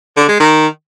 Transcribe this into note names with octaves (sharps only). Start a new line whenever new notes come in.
D3
G#3
D#3